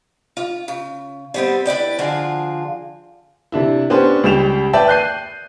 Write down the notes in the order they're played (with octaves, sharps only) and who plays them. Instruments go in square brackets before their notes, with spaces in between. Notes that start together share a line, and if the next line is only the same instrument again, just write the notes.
[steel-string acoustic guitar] F4
C#3
G3 B3 C4
E4 B4 D5 G5
D3 F3 D4 F4 F#4 G#4
[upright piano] C3 D4 E4
B3 C#4 D4 G4 C5
C#2 G3 G5 E7 F7
B4 D5 E5 G5 A5
F#6 G6 C7 D#7